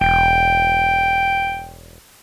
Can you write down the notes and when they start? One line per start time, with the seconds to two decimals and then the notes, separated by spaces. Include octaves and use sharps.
0.01 E1 G5